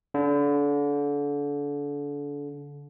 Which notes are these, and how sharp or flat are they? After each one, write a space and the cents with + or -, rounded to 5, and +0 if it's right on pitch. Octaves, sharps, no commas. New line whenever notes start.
D3 -30